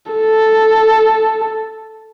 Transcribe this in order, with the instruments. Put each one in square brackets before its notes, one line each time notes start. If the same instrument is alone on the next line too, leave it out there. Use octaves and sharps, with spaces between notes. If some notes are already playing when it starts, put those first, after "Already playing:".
[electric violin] A4